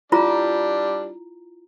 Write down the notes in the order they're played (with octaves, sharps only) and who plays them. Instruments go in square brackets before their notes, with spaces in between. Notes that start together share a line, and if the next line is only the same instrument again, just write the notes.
[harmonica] G3 D4 [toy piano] E4 F4 A#5